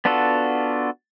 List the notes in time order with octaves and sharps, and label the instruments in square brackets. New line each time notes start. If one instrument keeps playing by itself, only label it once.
[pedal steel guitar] B3 D4 F4 F#4 A4